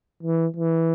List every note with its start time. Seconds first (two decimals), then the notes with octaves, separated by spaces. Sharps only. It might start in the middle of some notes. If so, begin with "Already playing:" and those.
0.23 E3
0.56 E3